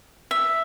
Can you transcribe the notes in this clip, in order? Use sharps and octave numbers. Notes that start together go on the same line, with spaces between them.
E5